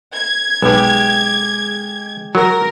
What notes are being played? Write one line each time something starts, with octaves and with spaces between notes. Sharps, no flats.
G#6
B1 G#3 G4
F#3 A#4